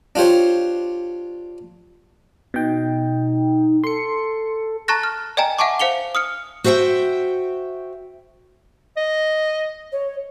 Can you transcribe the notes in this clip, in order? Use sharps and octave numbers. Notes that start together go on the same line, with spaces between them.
D4 F4 G4 C5 C#5
B2 D#4 G5
A4 C6 C#7
A5 A#5 C#6 F#6 A6 A#6
F6
D5 D#5 G5 G#5 A#5
E5 F#5 G#5 A5 C#6 D6
C5 F5 C#7 F7 G7
D#6 F6 C#7
F#4 C5 E5 F5 G5
D#5
C#5